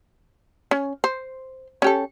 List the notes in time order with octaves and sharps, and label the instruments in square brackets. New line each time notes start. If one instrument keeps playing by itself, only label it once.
[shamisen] C#4
C5
C#4 G4 A4